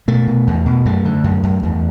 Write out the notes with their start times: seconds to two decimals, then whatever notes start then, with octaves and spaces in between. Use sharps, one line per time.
0.08 B2 A3
0.27 B2
0.47 E2
0.66 B2
0.85 F#2 A3
1.05 D3
1.24 F#2
1.43 F#2
1.63 E2